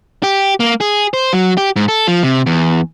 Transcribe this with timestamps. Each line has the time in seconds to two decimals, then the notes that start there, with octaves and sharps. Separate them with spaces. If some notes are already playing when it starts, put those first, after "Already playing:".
0.23 G4
0.60 A#3
0.81 G#4
1.14 C5
1.33 F#3
1.57 G4
1.76 G#2
1.88 A4
2.07 F3
2.23 C3
2.46 E2